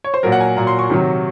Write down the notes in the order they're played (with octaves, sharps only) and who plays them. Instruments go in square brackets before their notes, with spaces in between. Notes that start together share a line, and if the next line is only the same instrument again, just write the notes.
[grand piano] C#5
C5
A#2 F#3 A#4
F#5
G#5
A#2 F#3 A#5
C6
C#6
C3 D#3 F#3